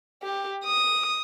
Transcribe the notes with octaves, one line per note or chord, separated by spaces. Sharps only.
G4
D#6